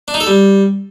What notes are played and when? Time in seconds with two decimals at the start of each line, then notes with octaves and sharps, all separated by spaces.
0.08 D4
0.14 D#4
0.20 A4
0.27 G3